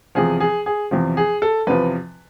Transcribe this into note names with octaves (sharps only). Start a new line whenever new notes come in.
E2 C3 F3 G#4
G#4
G#4
E2 C3 F3
G#4
A4
E2 C3 F3 B4